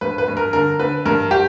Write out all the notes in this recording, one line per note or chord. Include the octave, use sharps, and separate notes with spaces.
G2 B4
B4
G2
A#4
D3 A#4
D3 B4
G2 A#4
G4